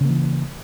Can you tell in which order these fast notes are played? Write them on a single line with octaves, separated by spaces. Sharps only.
C#3 A#3 E3